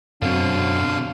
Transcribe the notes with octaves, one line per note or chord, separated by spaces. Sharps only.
F#2 B2 D3 F#3 C4 F5